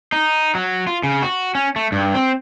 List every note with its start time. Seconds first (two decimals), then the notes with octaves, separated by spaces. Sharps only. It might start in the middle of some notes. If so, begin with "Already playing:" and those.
0.12 D#4
0.55 F#3
0.87 F4
1.03 C#3
1.22 F#4
1.55 C#4
1.76 A3
1.92 G2
2.14 C4